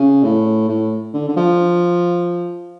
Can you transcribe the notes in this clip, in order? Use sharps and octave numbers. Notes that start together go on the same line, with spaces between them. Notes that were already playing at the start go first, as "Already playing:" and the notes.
Already playing: C#3
A2
A2
D3
D3
F3